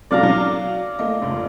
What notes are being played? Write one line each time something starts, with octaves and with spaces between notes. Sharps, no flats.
B2 F#3 A4 D5 F5 A#5
F#3
A3 A#3 D#5
F1 C#2